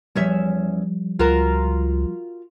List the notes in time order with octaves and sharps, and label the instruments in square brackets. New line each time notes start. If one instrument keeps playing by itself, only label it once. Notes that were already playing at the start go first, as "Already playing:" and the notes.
[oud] E2 C#4 E5 [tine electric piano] F3 G3
[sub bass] C#2 [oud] F4 F#4 A#4